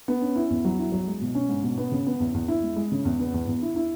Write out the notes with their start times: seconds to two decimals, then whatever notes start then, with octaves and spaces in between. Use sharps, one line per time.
0.08 B3
0.22 C#4
0.36 E4
0.50 E2
0.65 F#3
0.79 E4
0.92 F#3
1.07 G#3
1.21 B2
1.35 C#4
1.49 G#2
1.63 B2
1.78 B3
1.92 C#3
2.06 B3
2.20 E2
2.34 E2
2.48 E4
2.62 G#3
2.76 G#3
2.92 C#3
3.05 E2
3.19 B3
3.34 E2
3.48 E2
3.62 E4
3.76 E4